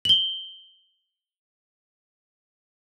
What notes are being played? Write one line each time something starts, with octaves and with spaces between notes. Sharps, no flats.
F#7 G7